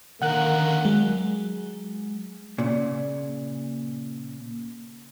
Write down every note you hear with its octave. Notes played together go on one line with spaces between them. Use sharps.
D3 D#3 A#3 A#4 F#5 F#6
F#3 G#3
A#2 C#3